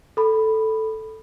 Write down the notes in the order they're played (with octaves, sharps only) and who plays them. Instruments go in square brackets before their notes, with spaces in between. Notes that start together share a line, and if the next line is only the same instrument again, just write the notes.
[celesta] A4 B5